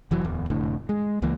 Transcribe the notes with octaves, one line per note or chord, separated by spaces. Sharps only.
F1 E3 F#3
D1 E2
F1 A2 D3
G#3
C#2 E3 A#3